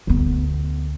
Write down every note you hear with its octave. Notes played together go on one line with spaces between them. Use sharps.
D2 B3